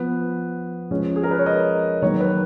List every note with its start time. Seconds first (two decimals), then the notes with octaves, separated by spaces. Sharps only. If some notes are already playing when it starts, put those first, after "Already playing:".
Already playing: F3 B3 B4
0.91 F3 G#3 C#4
1.16 G#4
1.23 A#4
1.31 B4
1.39 C#5
1.46 D#5
2.02 D#3 F#3 A#3 C#5
2.20 B4